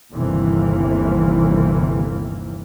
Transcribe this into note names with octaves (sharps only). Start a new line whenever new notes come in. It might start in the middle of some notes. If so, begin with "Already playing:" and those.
G1 D#2 C3 E3 A#3